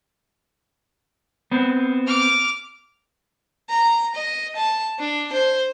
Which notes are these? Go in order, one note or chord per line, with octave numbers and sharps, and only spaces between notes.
B3 C4
D6 F6
A#5
D#5
A5
D4
C5